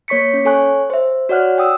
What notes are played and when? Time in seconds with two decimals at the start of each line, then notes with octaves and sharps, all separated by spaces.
0.08 A#3 C#5 C#6 B6 C#7
0.34 C#4
0.45 A4 C#5 G#5 C#6 F#6
0.90 C5 E5
1.29 F#4 C#5 D5 F#5 F6 F#6
1.58 G5 D#6 E6